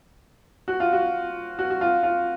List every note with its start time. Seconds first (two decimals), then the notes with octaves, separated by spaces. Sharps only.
0.68 F#4
0.80 F4
0.93 F#4
1.59 F#4
1.70 F#4
1.81 F4
2.03 F4